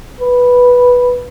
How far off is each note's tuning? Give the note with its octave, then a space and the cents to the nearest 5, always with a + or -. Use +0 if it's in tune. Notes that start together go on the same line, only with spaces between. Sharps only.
B4 -5